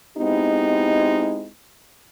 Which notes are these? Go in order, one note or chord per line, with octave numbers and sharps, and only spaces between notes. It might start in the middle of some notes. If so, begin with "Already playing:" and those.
G#3 B3 C4 D#4 E4 G4